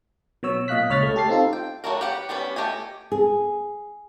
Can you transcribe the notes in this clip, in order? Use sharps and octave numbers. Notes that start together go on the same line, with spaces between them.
B2 F#3 C#5 E6
A#2 D#5 F5 F#6 B6
C#2 C#5 F6 A6 B6
A3
G4 A4 A5 A6 C7
C4 D#4 F4 A4
G5
F#3 G3 A3 F#4 A#4
G4 B4 F#5 G5
G3 B3 C#4 D4 B4
A3 G4 D#5 G#5
G#4